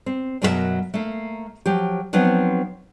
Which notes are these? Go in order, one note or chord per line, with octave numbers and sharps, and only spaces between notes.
C4
F#2 B2 F#3 F#4 A#4 E5
A3 A#3
F3 F#3 G4
F3 F#3 B3 C4 D#4